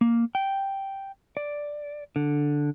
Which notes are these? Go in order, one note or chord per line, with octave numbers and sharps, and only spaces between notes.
A#3
G5
D5
D3